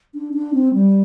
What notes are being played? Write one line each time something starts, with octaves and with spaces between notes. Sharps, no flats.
D4
D4
C4
G3